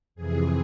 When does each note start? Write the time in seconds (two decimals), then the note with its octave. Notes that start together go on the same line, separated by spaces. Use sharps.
0.15 F2 C3 E3 G#4